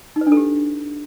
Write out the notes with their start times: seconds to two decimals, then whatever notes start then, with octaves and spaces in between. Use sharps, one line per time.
0.16 D#4
0.21 B4
0.27 D4
0.32 A4
0.37 G4